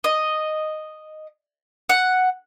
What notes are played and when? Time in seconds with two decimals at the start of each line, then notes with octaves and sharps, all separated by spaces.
0.04 D#5
1.89 F#5